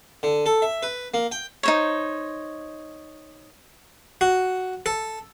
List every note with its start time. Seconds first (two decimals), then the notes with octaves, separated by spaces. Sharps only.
0.23 D3
0.46 A4
0.62 E5
0.83 B4
1.14 A#3
1.32 G5
1.63 D#4 C5 C#5
4.21 F#4
4.86 A4